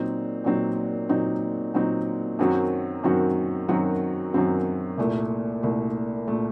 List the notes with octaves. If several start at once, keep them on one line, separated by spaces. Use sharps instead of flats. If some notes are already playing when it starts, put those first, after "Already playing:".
Already playing: A#2 F#3 C4 D#4
A#2 F#3 C4 D#4
A#2 F#3 C4 D#4
A#2 F#3 C4 D#4
F#2 D#3 F#3 C4 F#4
F#2 D#3 F#3 C4 F#4
F#2 D#3 F#3 C4 F#4
F#2 D#3 F#3 C4 F#4
C2 A#2 A3
C2 A#2 A3
A#2 A3